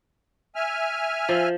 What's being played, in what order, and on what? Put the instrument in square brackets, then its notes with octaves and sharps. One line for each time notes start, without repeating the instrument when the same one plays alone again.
[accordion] E5 G#5 F6
[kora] F3